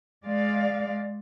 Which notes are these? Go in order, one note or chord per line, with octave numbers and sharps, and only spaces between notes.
G#3 D5 F5